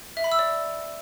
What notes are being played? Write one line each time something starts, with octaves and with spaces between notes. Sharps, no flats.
E5
B5
E6
D5